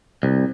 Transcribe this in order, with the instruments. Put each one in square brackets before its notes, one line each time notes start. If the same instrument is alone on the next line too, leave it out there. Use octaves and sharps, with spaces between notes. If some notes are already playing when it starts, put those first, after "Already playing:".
[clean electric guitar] C2